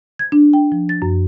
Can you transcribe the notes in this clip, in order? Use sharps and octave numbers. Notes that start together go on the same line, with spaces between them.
G#6
D4
G5
F3
A6
F#2